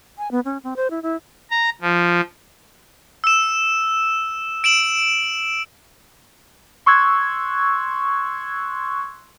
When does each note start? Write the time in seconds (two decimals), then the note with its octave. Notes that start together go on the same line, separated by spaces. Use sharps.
0.18 G#5
0.31 B3
0.45 C#4
0.64 C4
0.76 C5
0.91 E4
1.03 E4
1.51 A#5
1.82 F3
3.24 E6 E7
4.64 D7 E7 F#7
6.86 C6 C#6 E6 F#6 G#6